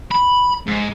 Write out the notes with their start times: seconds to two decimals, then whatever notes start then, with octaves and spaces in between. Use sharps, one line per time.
0.11 B5
0.67 G#2